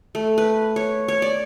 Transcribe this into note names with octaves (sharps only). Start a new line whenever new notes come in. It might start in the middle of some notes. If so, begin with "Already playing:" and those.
A3
B4
C#5
C#5
D5